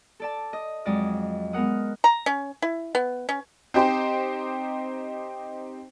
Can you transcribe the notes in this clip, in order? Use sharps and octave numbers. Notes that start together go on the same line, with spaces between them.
A4 D5 A5
D#5
F2 F#3 G#3 D5 D#5 D#6
G#3 B3 A#4 F#5 D#6
A#5
C#4
E4
B3
C#4
C4 D#4 G4 C5